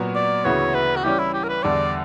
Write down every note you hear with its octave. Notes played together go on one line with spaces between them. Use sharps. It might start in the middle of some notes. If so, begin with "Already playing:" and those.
Already playing: A#2 F#3 B3 F#4
D5
D2 C#3 E3 B3 F#4 C#5
B4
F#4
E3 G3 C#4 G4
E4
G4
A#4
B4
E2 D3 G3 D5